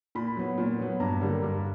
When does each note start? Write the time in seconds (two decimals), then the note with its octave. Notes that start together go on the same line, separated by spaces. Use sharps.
0.15 A#2 B5
0.37 F#3 B3
0.58 A#2
0.79 F#3 B3
1.00 G2 A#5
1.21 D3 G3 A#3
1.42 G2